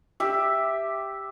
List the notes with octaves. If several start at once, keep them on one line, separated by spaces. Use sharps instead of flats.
G4 E5